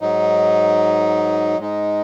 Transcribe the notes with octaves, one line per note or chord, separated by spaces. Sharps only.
G#2 F#3 D#4
G#2 G#3 D#4